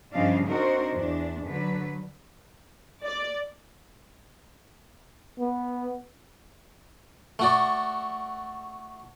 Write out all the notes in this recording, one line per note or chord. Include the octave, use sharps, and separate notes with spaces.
G2 C#3 F3 D4 D#5 F5
C4 D4 D#4 F#4 A#4 C5
E2 D4
D3 F#3 B4
D5
B3
A3 F#4 D5